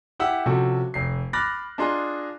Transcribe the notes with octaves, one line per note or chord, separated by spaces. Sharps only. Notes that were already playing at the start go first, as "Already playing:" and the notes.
E4 G4 E5 F#5 E6
C3 F3 C#4 F#4 A4
F1 C7
B5 D6 F6 F#6 A6 A#6
D4 F4 G#4 D#5 A#5 C6